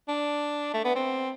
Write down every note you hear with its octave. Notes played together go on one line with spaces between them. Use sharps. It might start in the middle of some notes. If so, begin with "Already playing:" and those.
D4
A3
B3
C4